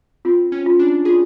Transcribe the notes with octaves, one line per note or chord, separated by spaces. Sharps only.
C4 F4
C#4
F4
D4
F4 G#4